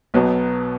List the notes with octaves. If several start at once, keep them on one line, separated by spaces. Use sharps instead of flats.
B1 B2 F#3 B3